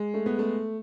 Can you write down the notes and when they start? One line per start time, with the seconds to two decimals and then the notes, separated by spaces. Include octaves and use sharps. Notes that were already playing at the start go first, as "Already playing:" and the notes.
Already playing: G#3
0.14 A3
0.26 B3
0.39 A3